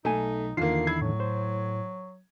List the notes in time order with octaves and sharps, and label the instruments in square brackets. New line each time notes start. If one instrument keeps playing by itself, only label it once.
[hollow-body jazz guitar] B1 G#5 [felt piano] A3 [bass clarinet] D#4
[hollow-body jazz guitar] E2 D3 D#3 [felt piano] A#3 F4 [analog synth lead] C7
[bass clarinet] E4 [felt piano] G#6
[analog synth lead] A2 [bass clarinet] F#3
[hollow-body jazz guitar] C5